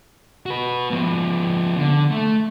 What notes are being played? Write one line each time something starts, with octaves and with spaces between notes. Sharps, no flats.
F#4 B4
F3 B3
D3
A3